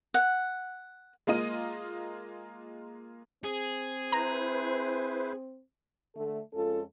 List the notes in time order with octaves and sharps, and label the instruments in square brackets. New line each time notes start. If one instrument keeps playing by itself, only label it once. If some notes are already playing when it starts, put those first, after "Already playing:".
[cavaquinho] F#5
[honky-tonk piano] G#3 A#3 F4 D#5 D#7
[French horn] C4 [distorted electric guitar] G#4
[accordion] E4 B4 C5 [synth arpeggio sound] A#5
[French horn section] D3 A3 A4
F2 G#3 C#4 F4 A4